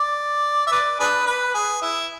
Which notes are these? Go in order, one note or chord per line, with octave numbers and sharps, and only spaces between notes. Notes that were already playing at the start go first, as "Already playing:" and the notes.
Already playing: D5
E5
B4 D5
D4 G#4 B4
B4
G#4
E4